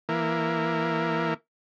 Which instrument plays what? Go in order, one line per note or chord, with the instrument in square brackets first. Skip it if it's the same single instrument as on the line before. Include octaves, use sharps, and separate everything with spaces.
[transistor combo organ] E3 A#3